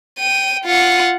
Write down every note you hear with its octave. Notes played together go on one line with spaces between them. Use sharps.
G5 D#7
F4 F#5